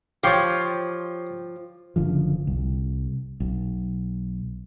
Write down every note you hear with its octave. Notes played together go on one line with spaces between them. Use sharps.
F3 G4 C#5 A5
F#1 D3 F3
C2
B1